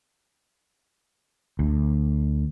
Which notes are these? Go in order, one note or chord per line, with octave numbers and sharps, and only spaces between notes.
D2